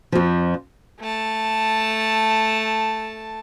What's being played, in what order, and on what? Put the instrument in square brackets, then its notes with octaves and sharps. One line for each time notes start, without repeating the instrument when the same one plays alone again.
[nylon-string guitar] F2 F3
[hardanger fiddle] A3 A5